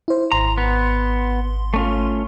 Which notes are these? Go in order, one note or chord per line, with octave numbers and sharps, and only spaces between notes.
E4 C5
G#1 A#5 C6
B3
A3 C#4 F4